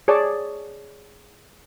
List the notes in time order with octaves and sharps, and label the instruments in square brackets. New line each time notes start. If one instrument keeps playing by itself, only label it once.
[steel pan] G#4 C#5 D5 A5